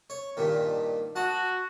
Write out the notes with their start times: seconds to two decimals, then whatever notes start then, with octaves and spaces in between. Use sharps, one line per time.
0.10 C#5
0.37 G2 A#2 D#3
1.16 F#4 A5 D#6